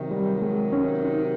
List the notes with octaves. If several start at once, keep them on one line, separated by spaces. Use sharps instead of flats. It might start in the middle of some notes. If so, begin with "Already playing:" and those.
Already playing: C3 D#3 F#3
G3
G#3
C#4
D#4